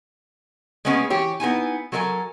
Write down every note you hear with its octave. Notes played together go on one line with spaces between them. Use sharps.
G#3 A#3 B3 C#4 G#4
E3 G4 C#5
B3 D#4 E4 G#5
F#3 A4 A#4 D5 G#5